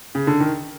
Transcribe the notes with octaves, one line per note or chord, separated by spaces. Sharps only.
C#3
D3
D#3